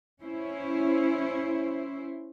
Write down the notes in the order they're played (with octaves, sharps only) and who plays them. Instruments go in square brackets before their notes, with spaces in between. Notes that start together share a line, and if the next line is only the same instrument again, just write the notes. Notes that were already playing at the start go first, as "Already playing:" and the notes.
[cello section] C#4 E4 C5